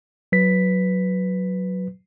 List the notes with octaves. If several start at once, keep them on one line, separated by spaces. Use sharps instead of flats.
F#3 B4 B6